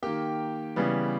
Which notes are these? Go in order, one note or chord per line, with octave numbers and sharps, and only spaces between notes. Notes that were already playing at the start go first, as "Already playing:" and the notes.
D#3 A#3 G4 G5
C#3 E3 G3 B3